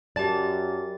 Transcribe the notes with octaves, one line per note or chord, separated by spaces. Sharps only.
F#2 G4 D5 A5 A6